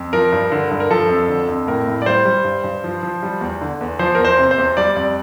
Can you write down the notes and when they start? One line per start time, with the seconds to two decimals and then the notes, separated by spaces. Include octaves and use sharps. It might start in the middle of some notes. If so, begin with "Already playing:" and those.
Already playing: F2
0.13 F3 A#4
0.33 G2
0.52 D3
0.71 G2
0.80 A#4
0.90 F3 A4
1.09 F2
1.28 D3
1.48 F2
1.67 A2 A#4
1.87 A2
2.02 D5
2.06 G3 C5
2.25 G3
2.44 G2
2.64 G2
2.84 F3
3.03 F3
3.23 G3
3.41 E2
3.61 D3
3.81 E2
3.99 F3 C5
4.15 E2 A#4
4.25 C5
4.39 C3
4.51 C5
4.58 E2
4.77 G3 D5
4.96 F2 D5